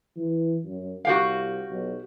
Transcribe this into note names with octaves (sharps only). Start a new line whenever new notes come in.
E3
F#2
C2 F#4 G4 F5
B1